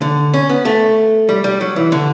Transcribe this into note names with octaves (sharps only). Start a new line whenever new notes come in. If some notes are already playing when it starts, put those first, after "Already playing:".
D3
C#4
B3
A3
G3
G3
F#3
E3
D3